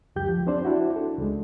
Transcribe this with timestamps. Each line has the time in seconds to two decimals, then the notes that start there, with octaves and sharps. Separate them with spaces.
0.16 C#2 F#2 G4 G6
0.29 F3
0.47 C4 D4 C5 D5
0.65 D4 E4 F#4
0.96 A4
1.18 C#2 G#3